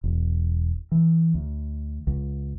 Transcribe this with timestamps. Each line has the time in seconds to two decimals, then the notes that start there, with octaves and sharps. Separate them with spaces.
0.04 E1
0.92 E3
1.34 D2
2.07 C#2